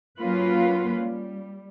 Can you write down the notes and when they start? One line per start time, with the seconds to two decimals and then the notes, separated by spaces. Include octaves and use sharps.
0.18 F#3 A#3 C#4 F4 B4
1.00 G3